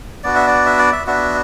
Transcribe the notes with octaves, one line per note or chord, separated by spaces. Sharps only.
B3 D4 F#4 D5
E5
D5
E5
D5
E5
B3 D4 F#4 E5